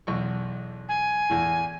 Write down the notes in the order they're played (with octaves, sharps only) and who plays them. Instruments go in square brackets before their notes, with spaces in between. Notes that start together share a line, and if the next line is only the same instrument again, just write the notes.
[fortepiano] B1 E2 C#6
[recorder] G#5
[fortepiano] E2 A2